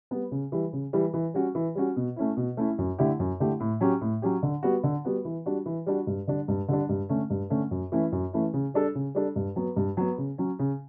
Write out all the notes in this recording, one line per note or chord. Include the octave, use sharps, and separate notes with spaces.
G3 B3
C#3
E3 G3
C#3
E3 G3
E3
G3 C#4 F#4
E3
G3 C#4 F#4
B2
A3 C#4 E4
B2
A3 C#4 E4
F#2
D3 A3 E4 G4
F#2
D3 A3 E4 G4
A2
F#3 C#4 G4
A2
F#3 C#4 G4
D3
G3 B3 F#4
D3
G3 B3 F#4
E3
G3 D4 F#4
E3
G3 D4 F#4
G2
D3 G3 D4
G2
D3 G3 D4
G2
D3 A3 C#4
G2
D3 A3 C#4
F#2
E3 A3 C#4 E4
F#2
E3 A3 C#4 E4
C#3
G3 D4 A4
C#3
G3 D4 A4
G2
F#3 B3
G2
F#3 B3
C#3
F#3 C#4
C#3